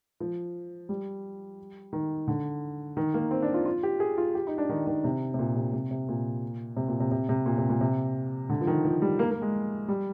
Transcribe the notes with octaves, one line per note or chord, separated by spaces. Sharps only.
F3
G3
D#3
D3
D#3
A#3
C4
D4
F4
F4
G4
G#4
F4
G4
D#4
D4
D#3
D#3
C3
C3
A#2
C3
C3
C3
A#2
C3
A#2
C3
C3
C3
A#2
C3
A#2
C3
D3
F3
D#3
F3
G3
A#3
A#3
G#3
G3